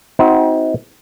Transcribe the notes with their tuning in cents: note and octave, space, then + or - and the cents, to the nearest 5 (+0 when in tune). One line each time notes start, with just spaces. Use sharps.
C4 +0 D#4 +40 F#4 +0